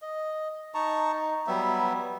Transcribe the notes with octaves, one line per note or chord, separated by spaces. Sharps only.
D#5
D#4 A5 A#5 C#6
D#4
F#3 G3 B3 E5